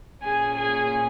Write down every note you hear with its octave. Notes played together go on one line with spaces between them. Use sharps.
A#2 A#3 C#4 G#4 G#5
G#4 G#5